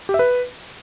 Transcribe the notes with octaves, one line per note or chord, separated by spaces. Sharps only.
G4
E5
B4